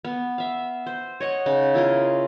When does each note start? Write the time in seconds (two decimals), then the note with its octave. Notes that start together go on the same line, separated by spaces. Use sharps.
0.05 B3
0.38 E5 F5
0.86 C5
1.20 C#5 D#5 F#5
1.46 C#3 D#4
1.74 E4 F4 A#4 D#5